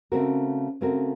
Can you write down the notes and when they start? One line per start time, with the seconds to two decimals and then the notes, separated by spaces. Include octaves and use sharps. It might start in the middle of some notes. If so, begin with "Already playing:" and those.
0.12 C#3 A3 C4 F#4 A#4
0.81 C#3 A3 C4 F#4 A#4